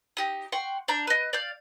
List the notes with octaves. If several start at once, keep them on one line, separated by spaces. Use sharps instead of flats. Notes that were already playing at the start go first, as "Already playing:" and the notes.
D#4 G4 D#6
F#5 G5 C6 C#6
D4 A#5 G6
B4 D#5
D5 F5 G6